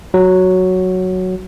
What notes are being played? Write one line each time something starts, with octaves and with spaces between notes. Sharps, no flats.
F#3